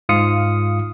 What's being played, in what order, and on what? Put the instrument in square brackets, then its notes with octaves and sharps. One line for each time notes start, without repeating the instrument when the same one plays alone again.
[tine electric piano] G#2 F4 F5 D#6 C#7